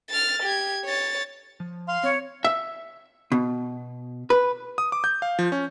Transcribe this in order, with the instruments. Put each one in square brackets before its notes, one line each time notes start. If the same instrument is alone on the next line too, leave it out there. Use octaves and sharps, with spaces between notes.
[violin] F6 A6
G4 G#6
C#5 A6
[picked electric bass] F3
[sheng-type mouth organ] F5 C6
[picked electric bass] C4 [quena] C#5
[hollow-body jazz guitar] E5
B2
B4
[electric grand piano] D#6
D6
G6
F5
F3
C#4